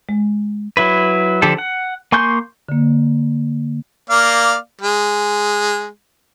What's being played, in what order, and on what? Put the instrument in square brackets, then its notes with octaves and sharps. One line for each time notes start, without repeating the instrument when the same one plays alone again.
[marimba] G#3
[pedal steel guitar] F#3 E4 B4
D3 F3 G4 A4
F#5
A#3 G#5 C6 C#6 G6
[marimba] D3 A#3
[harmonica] A#3 D5 F5
G#3